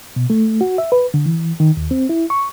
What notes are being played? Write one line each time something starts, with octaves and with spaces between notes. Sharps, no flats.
B2
A3
F#4
E5
B4
D3
E3
D#3
D#2
C4
E4
C#6